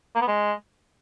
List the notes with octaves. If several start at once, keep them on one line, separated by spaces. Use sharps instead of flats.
A#3
B3
G#3